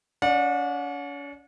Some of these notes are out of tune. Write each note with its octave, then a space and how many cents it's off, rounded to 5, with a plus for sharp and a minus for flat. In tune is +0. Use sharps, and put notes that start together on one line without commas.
C#4 +40 D5 +15 F#5 -35